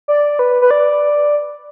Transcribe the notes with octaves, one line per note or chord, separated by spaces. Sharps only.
D5
B4
B4
D5